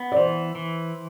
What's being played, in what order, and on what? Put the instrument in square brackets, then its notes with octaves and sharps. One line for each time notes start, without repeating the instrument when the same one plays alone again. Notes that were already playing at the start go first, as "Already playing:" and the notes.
Already playing: [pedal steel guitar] B3
[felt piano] D5
[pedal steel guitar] E3 [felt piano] C5
[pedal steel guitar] E3